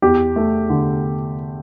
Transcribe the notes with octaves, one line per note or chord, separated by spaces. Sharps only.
E2 G4
A3
D3